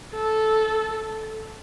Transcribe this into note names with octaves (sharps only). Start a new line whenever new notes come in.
A4